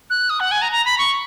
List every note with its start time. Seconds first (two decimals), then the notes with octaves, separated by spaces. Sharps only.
0.10 F#6
0.30 D#6
0.40 F#5
0.51 G#5
0.62 A#5
0.72 A#5
0.85 B5
0.98 C#6